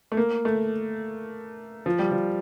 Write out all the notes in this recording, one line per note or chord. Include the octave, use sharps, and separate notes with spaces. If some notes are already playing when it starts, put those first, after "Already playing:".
A3
A#3
A3
F3
G3
F3